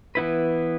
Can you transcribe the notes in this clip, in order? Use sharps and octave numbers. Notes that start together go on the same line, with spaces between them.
E3 B3 E4 B4